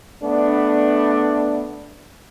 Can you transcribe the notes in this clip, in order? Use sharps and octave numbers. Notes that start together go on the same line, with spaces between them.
A3 B3 D4